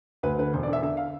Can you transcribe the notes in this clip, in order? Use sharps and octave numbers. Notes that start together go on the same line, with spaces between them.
D2 B4
D3 B4
E1 C5
D5
D3 E5
D3 E5
F5